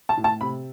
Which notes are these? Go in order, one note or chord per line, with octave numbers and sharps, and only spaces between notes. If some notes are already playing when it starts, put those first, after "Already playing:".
A5
A2
A5
C3 B5